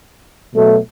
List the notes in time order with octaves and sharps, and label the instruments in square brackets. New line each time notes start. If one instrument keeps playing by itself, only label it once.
[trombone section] B2 F#3 A3